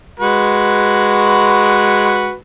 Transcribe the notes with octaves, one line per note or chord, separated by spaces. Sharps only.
G#3 F#4 B4